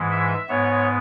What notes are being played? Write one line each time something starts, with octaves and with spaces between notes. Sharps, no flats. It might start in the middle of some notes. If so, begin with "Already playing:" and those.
Already playing: G#2 E3 G#3
E5
G#2 G#3 B3 C#5